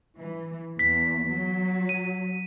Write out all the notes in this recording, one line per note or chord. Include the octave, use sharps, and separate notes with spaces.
E3
E2 B6
F#3
D#7